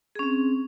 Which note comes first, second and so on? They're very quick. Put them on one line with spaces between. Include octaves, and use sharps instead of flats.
G#4 C#4 C4